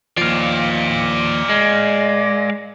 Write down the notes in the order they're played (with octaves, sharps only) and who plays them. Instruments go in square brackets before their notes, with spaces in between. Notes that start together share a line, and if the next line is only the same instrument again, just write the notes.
[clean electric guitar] D#2 F3 [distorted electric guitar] D5 F5
[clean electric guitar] G#3